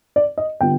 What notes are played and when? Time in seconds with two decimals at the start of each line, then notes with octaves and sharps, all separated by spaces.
0.16 D5
0.38 D#5
0.61 D3 G3 B3 F4 G5